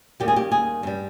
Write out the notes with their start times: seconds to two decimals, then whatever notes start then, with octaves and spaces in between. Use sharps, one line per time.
0.20 D#2 D#3 G3 G4
0.28 G#4
0.36 G4
0.52 G#4
0.83 G2 G3